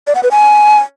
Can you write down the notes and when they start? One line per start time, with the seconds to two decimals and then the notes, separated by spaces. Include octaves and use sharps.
0.07 D5
0.15 F#5
0.23 B4
0.31 G#5